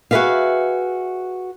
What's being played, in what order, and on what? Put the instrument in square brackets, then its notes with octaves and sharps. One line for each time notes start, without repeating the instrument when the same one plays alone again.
[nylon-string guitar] F#4 G#4 A#4 B4 E5 F5